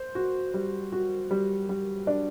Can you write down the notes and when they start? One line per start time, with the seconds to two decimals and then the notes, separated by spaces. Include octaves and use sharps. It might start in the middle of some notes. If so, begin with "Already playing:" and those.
Already playing: C5
0.15 F#4
0.54 G3
0.92 F#4
1.31 G3
1.69 G3
2.07 D4